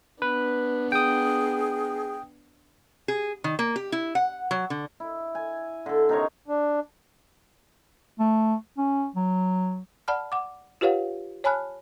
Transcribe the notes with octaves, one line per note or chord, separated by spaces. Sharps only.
B3 D4 B4
G#4 G5 D#6
G#4
D#3
A#3
G4
E4
F#5
F#3
D3
E4
G#5
D3 A4
C3 D#4 A#4 C#5
D4
A3
C#4
F#3
D5 F#5 A5 B5 F6
F#5 D6
F4 G4 B4 C#5 F5 F#5
C#5 G#5 A5 B5 F6 F#6